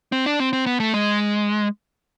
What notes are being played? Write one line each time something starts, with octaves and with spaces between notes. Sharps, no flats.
C4
D4
C4
C4
B3
A3
G#3